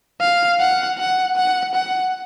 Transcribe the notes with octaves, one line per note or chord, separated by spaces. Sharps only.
F5
F#5
F#5
F#5
F#5